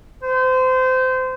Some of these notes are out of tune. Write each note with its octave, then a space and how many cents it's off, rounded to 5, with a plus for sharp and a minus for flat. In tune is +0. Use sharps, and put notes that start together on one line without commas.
C5 -25